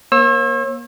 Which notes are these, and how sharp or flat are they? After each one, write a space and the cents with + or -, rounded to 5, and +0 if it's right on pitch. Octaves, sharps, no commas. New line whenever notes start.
A#3 +25 C#5 -45 E6 +0